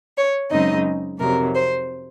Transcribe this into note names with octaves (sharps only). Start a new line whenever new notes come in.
C#5
F#2 C#3 G#3 C4 D#4 D#5
F2 C3 D#3 F#3 A#4
C5